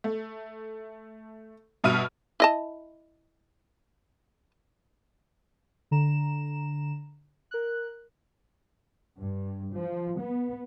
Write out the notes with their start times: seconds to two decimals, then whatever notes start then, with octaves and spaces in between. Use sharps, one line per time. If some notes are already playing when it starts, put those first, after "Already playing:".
0.04 A3
1.84 G2 B2 E5 F6 D#7
2.40 E4 D#5 A5
5.91 D3 A#5 E7
7.51 A#4 F#6
9.20 G2
9.73 F3
10.20 B3